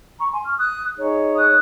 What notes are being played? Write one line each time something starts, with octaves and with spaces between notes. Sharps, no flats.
A#5 C#6
G#5 C6
C#6 F6
D#6 F#6
D#4 G#4 C#5
D#6 F#6